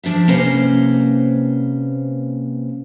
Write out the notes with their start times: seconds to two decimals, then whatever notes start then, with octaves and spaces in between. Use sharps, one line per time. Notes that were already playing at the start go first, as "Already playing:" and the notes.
0.04 F3 D4 C5 E5
0.28 C3 A#3 C#4 B4 C5